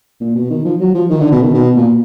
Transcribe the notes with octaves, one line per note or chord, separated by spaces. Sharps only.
A#2
B2
D#3
F3
F#3
F3
D#3
D3
B2
D#3
B2
A#2